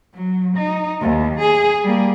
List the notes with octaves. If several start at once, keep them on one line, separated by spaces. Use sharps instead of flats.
F#3
D#4
D#2
G#4
G3 A#3